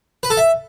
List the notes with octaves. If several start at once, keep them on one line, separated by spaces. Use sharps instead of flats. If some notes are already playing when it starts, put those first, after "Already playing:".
B4
A4
E5